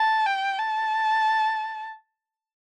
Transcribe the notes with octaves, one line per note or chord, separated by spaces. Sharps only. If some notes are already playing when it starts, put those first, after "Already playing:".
Already playing: A5
G5
A5